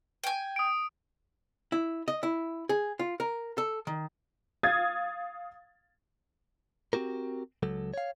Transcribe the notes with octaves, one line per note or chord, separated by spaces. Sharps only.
G5 G#5
D#6 D7
E4
D#5
E4
G#4
F4
A#4
A4
D#3
F5 D#6 G#6 A6
C4 C#4 F#4 G4 A#4
C#2 F#3 A4
C#5 F5